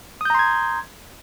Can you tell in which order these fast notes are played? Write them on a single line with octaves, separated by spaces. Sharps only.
D#6 G6 A#5 C6 G#6